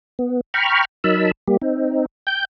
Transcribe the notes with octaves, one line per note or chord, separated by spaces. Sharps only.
B3
G5 A#5 B5 C#6 F6
F#3 D#4 A#4 A5 B5 E6
G3 A#3 G4
C4 D#4
G5 G6